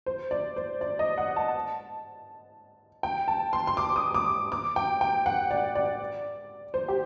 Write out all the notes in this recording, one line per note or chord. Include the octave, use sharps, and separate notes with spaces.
C5
D5
C5
D5
D#5
F#5
A5
G5
A5
C6
C6
D6
D#6
D6
D6
G5
G5
F#5
D5
D5
C5
G4